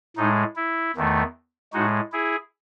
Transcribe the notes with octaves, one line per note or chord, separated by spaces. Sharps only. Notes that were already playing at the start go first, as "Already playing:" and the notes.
A2 G#3 D#4
E4
E2 D#3 A3
A2 G#3 D#4 F#4
E4 G#4